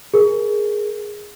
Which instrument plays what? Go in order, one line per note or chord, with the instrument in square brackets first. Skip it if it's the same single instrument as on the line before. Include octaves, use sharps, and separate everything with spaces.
[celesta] G#4 A#4